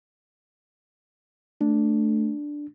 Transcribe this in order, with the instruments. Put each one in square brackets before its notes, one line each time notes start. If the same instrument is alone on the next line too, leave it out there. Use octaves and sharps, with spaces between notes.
[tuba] A3 [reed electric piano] D4